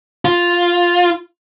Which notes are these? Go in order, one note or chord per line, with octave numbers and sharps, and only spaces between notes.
F4